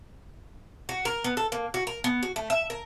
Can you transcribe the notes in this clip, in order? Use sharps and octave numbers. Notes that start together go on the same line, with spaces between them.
F#4
A#4
B3
A4
A#3
F#4
A#4
B3
F#4
A3
E5
A#4